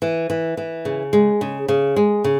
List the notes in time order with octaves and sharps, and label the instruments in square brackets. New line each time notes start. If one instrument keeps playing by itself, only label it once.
[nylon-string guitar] E3
E3
E3
C#3
G#3
C#3
C#3
G#3
C#3